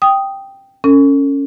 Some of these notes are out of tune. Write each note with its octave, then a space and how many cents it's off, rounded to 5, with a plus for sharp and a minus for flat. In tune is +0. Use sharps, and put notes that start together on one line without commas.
G5 +0 D#6 +0
C#4 +0 A4 +45